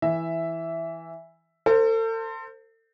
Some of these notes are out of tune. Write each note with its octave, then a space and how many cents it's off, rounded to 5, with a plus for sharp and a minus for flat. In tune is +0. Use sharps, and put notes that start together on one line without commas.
E3 +0 E5 +0
A4 +40 C5 +0